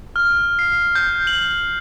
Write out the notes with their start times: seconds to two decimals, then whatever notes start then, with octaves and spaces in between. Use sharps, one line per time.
0.16 F6
0.59 C7
0.95 G6
1.27 F#7